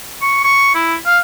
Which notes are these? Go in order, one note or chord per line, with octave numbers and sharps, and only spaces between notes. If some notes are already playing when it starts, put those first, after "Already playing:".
C#6
C#6
E4
F5